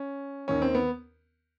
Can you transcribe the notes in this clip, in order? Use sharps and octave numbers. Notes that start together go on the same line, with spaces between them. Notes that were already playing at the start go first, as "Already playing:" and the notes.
Already playing: C#4
D#2 D#3 C#4
C4
B3